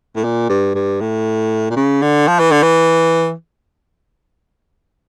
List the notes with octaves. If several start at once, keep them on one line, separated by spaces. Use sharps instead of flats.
A2
A#2
G2
G2
A2
A#2
C#3
D3
F3
E3
D3
E3